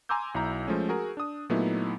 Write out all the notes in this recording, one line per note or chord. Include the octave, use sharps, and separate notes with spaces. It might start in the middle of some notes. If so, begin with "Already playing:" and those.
G#5 A#5 C6 D6 E6 G6
B1 E4 A#5
F3 G#3 A3 C#4
F#4 G#4 A#4
D4 D#6
A#2 F#3 A3 B3 D#4 E4